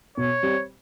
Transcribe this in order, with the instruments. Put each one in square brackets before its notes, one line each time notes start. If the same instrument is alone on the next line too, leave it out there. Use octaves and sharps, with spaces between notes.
[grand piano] B2 [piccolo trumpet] C#5
[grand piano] G3 C4